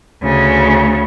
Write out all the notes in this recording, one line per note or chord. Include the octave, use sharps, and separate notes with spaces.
D2 C#3